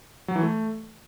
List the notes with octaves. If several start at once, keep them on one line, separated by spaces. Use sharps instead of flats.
F#3
E3
A3